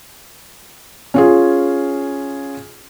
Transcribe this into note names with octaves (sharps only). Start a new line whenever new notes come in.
C#4 F4 G#4